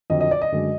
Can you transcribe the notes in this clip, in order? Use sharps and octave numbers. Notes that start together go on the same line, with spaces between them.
F2 D3 F#3 D#5
D#5
D5
D#5
F#2 D3 G#3